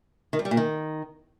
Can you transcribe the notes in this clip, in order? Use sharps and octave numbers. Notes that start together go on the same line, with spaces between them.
D#3
G2
G3
A#2
D#3